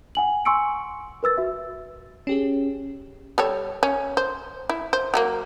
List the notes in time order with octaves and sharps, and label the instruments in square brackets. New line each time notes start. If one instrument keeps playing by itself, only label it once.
[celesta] F#5 G#5 F#7
G#5 C6 C#6 E6 C#7 D7
A#4 B4 E6 A6
F#4 E5
[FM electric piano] C#4 G4 G#4
[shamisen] G3 A4 C#5
C#4
C5
E4
C5
F#3 A3 A#3